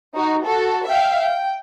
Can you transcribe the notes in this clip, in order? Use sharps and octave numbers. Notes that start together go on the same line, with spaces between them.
D#4 F#4
F#4 A4
E5 F5 G5
G5